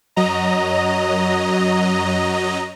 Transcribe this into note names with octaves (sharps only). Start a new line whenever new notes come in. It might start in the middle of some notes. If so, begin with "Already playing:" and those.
F#2 F#3 D#5 A#5